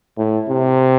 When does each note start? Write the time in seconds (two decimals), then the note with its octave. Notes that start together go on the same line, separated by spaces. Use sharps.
0.18 A2
0.49 C3